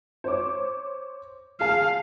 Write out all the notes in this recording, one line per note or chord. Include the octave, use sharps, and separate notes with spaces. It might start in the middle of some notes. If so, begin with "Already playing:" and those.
C5 C#5 D6
G#4 F5 A5